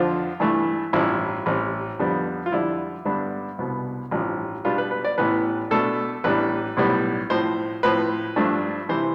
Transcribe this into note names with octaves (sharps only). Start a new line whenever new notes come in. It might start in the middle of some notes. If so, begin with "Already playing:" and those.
Already playing: F2 D3 F3 C4 F4
G2 E3 A3
A1 G2 F3 C4 E4
A1 A2 G3 C4
F2 D3 G3 B3
F4
F2 D3 G3 D4 E4
G2 D3 G3 B3 D4
C2 B2 B3
A1 G2 F3 C4
B2 G3 B3 D4 F4
B4
B4
D5
A1 A2 E3 B3 B4
B2 A3 D4 A4
A1 A2 G3 B3 D4 B4
B1 A2 G3 B3
A2 F3 C4 C5
A2 F3 C4 B4
G2 F3 A3 D4
C3 E3 C5